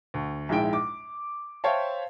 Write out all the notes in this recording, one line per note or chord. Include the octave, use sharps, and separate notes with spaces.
D2
A#1 G#2 G#3 E4 G5 D7
D6
C5 C#5 E5 F5 G5 A5